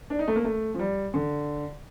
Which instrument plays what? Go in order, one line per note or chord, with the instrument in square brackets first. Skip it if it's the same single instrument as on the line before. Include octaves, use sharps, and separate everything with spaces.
[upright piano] D4
D#4
A3
A#3
A3
F3
G3
D3